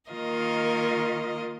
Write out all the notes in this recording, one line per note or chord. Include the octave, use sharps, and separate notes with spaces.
D#3 A#3 F4 A#4 D#5